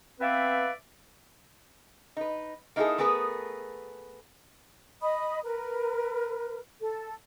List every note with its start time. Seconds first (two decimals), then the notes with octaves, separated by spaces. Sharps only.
0.20 B3 C4 B4 D5 E5 F5
2.17 D#4 B4
2.76 A#3 D#4 E4 F#4 G#4 A4
2.98 A3 B3 G#4 A#4 B4
5.01 D#5 B5 D#6
5.43 A#4 B4
6.80 A4